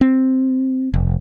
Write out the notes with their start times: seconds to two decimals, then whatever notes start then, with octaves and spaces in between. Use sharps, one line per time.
0.01 C4
0.94 F1